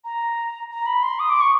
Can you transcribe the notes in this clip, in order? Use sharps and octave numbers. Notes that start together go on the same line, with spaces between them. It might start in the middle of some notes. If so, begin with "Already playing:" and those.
A#5
A#5
B5
C6
D#6
D6
C#6